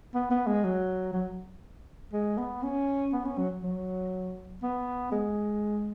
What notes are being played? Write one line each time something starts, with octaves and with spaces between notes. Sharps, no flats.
B3
B3
G#3
F#3
F#3
G#3
B3
C#4
B3
C#4
F#3
F#3
B3
G#3